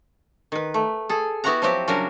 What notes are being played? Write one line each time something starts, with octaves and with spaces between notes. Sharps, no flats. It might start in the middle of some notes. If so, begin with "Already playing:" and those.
D#3 B4
A3
G#4 A4
B3 E4 F#4 G4 F#5 A#5
F3 F#3 C4 E4 F#4 G4
C#3 F#3 G3 D4 F#4 A#4